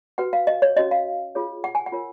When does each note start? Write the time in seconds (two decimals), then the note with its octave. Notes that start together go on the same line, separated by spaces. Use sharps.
0.18 F#4 B4 F#5
0.33 F5
0.47 D#5
0.62 C#5
0.76 C#4 F#4 C#5 D#5
0.91 F5
1.35 F4 G#4 C#5
1.64 F#5
1.75 G#5
1.86 F#5
1.92 F4 A#4 C#5